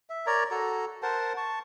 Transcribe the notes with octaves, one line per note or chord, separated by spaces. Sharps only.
E5
A#4 C#5 D5 A#5
F#4 A4 A#5
A#4 C5 F#5 A5
A5 C#6